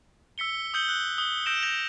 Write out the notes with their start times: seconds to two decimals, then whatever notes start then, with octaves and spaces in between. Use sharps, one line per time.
0.38 E6 B6 C#7 G7
0.74 D#6 E6 G6 C#7 F#7 G7
0.89 F#6
1.18 D#6 G7
1.46 E6 G6 A#6 D7 E7
1.63 G6 A#6 F7